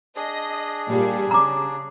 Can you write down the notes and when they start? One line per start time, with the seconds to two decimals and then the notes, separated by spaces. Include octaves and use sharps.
0.16 D4 G#4 D#5
0.88 A#2 G3
1.31 C#3 A#5 D6